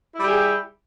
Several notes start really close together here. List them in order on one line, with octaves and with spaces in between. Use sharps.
E4 G3 G4 G#4